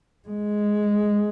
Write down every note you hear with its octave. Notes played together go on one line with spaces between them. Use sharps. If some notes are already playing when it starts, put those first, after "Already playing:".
G#3